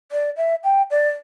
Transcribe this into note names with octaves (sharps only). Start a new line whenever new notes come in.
D5
E5
G5
D5